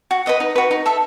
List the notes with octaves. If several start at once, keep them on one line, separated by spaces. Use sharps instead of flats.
F#4
B4 D#5 F#5
D#4
F#4 B4
D#4
A4 E5